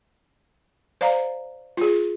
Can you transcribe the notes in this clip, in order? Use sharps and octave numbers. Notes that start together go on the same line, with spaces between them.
C5 D5 F5 A#5
F4 G#4